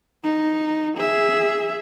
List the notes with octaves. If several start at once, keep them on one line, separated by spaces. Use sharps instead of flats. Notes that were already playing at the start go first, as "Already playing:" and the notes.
D#4
G#4 E5